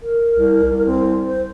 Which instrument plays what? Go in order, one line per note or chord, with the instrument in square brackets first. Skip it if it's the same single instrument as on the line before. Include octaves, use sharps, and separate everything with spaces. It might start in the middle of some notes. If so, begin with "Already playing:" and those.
[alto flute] A#4
[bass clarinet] C2
C2
[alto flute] C4
C5